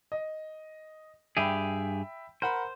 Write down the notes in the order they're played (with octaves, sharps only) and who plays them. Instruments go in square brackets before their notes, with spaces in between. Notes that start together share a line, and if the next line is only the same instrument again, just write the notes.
[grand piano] D#5
[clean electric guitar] G2 G4 G#4 [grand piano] E5 G5 B5
[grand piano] A#4 F#5 B5 [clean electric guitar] C5